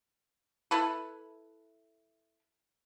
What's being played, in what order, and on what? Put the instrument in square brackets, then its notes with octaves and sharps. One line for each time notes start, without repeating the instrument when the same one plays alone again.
[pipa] E4 A4 B4